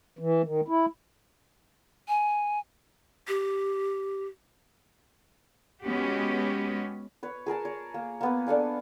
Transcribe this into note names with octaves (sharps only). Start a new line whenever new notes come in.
E3
D#3
E4
G#5
G4
G#3 B3 C#4 F#4 G4
B4 C#5
G#4 A#4 G#5 A5
C#5
A#3
A#3 B3 B4
D4 A4 F5 G#5